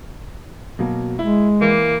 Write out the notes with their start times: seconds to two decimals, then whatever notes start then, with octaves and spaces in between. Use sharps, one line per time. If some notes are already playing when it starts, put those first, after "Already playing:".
0.79 B2 F#3 A#3
1.19 G#3 E4
1.61 E3 A#3